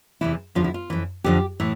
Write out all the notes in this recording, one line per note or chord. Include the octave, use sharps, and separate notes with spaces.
E2 C3 E3 E4
E2 D3 F3 F4
E4
F4
F2 E3
F2 D3 F3 G4
A2 E3